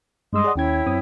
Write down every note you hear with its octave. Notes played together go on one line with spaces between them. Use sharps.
G2 G#3 D#5 C6 D#6 E6
G#4 D5 F#5
D#2 C#4 E4 C#5 G5 G#6
F#2 C4 D#6